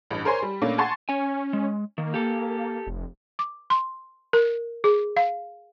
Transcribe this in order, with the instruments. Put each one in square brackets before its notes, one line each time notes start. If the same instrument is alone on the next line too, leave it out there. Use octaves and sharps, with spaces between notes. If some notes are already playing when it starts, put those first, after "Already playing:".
[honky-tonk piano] A1 G2
A#4 C5 C#5 G#5 C6
G3
A#2 A3 A#3 C#4 D4
F#5 G#5 A5 C6 C#6 A6
[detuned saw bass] C#4 [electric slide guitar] C#5 G#5
[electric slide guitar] G#3
[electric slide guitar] D#3 [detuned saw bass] A#3
[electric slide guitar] G4 A4
[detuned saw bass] F1
[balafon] D6
C6
A#4
G#4
F5